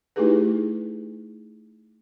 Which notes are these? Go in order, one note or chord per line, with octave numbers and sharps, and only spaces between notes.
A3 D#4 E4 G4 G#4 B4